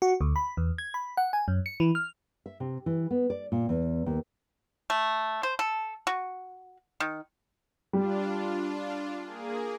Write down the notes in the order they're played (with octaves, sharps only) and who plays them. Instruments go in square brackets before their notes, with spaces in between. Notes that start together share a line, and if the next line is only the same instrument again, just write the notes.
[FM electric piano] F#4
D2
B5
E2
G#6
B5
F#5
G#5
F#2
C#7
E3
F6
[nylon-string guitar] E5
C3
E3
B3
D5
A#2
E2
D#2
[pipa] A3
C5
A4
F#4
D#3
[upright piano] G3 [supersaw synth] D4 F4
[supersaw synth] A#3 G#4